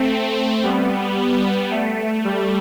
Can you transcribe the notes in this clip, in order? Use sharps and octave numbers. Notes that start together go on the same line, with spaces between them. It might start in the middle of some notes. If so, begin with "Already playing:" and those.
Already playing: A3 C4
A3
G3 B3
A3
G3